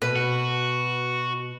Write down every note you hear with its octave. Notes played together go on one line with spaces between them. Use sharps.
B2 B4
F#4